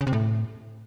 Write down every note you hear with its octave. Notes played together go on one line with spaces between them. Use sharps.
C#3
C3
A2